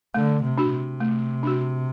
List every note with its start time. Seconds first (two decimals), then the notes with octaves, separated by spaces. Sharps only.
0.14 D3 A3
0.43 C3
0.58 D4 F#4
0.72 C3
1.00 A3
1.43 D4 F#4